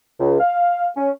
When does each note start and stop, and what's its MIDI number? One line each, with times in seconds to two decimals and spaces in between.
0.20 0.39 37
0.40 0.86 77
0.97 1.11 61